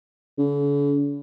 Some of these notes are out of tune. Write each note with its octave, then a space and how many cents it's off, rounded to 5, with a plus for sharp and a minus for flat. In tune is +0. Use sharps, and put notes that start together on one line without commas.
D3 -45